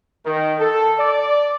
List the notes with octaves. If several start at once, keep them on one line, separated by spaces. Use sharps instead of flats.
D#3
A4
D5